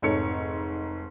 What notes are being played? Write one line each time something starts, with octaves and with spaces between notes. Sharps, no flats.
F1 G#2 A4 C#5 C#7